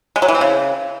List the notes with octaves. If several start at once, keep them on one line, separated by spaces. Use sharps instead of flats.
G#3
F#3
E3
C4
C#3